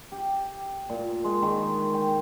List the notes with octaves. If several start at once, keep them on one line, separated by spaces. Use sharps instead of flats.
G4
A#2
G#3
D#3
G5